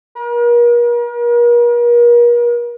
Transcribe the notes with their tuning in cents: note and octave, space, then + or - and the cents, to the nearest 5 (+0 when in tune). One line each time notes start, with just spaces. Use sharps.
A#4 +40